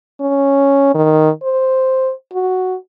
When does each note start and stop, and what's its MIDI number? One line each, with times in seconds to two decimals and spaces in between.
0.20 0.93 61
0.94 1.29 51
1.43 2.12 72
2.33 2.76 66